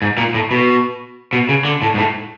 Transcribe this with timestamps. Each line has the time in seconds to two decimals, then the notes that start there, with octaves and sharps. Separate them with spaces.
0.02 G#2
0.17 A#2
0.34 A2
0.51 B2
1.33 B2
1.49 C#3
1.65 D3
1.82 A2
1.94 G#2
1.98 A2